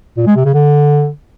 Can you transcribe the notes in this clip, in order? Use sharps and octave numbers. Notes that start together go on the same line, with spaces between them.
A#2
G#3
C3
C#3
D3